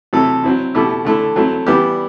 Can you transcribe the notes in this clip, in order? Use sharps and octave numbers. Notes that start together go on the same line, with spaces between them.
C3 F#3 A3 E4 A4
F#3 C4 E4
B2 A3 E4 G4
D3 A3 E4
F#3 A3 C4 E4
E3 G3 B3 E4 G4